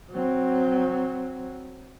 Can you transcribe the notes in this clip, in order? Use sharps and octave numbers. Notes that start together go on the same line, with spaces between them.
F#3 C4